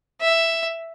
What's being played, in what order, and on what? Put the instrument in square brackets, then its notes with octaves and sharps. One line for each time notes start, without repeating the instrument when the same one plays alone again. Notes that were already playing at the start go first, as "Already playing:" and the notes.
[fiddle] E5